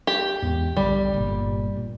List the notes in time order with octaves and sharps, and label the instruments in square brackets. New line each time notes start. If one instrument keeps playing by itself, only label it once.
[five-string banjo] G4
[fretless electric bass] E2 G#2
[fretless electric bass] A#1 D3 [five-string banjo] G3
[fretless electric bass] G1 A#2
A#2